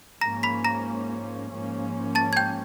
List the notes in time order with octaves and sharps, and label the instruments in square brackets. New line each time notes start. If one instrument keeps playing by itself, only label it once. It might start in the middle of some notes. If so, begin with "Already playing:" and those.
[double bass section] G#2 F3 A#3 C#4 [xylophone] A#5 A#6
[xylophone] B5 B6
A#5 A#6
[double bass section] G#2 F3 A#3 C#4
[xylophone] A5 A6
G#6
G5 G6